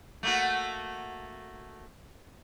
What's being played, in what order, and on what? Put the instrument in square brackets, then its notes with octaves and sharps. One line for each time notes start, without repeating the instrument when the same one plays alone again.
[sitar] A3 A#3 F#4